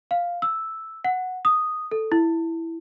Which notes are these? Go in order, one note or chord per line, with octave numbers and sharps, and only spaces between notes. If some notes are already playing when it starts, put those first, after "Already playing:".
F5
E6
F#5
D#6
A4
E4